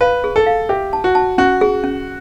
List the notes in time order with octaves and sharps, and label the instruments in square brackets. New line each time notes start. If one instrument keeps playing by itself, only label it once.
[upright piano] B4 [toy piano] F5
[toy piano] G#4
[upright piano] A4
[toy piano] F5
[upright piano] G4 [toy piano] E5
[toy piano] A5
[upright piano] F#4
[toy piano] A5
[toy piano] C#4 [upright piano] F#4
[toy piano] G#4
C#4